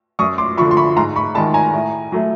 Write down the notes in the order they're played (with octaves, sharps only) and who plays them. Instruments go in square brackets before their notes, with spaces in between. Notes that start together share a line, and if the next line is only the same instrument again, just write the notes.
[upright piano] F#2 C#6 D#6
C6 D6
F3 B5 C#6
D3
C6
B5 C#6
G#2 A#5 C6
B5 C#6
D#3 G#3 A5 B5
G#5 A#5
A2
F#3 A3